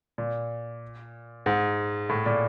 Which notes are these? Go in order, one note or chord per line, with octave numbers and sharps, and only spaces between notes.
A#2
G#2
A2
A#2